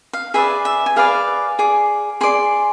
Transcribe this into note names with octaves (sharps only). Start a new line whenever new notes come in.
F5
G#4 B4 D5 E5
E5
G#5
G#4 B4 D5 F5
G#4 D5
G#4 D5 C6